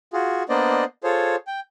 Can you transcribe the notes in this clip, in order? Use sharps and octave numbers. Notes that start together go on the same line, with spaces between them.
F4 F#4 G#4
A#3 B3 D4 C5 D5 D#5
F4 G#4 A4 C5 C#5
G5